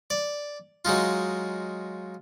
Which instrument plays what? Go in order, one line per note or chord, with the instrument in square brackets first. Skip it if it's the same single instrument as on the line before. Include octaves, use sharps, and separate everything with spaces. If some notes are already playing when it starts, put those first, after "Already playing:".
[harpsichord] D5
F#3 G#3 D#4 F4